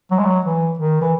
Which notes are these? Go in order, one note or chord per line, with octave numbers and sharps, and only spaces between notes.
F#3
G#3
F#3
E3
D#3
E3